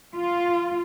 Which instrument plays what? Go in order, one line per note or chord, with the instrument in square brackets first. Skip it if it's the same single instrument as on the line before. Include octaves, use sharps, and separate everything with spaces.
[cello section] F4